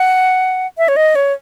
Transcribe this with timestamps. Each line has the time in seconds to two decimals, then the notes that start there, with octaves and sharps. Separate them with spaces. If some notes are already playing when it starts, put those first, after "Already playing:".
Already playing: F#5
0.78 E5
0.88 C#5
0.96 D#5
1.15 C#5